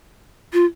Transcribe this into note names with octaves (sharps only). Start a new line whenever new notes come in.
F4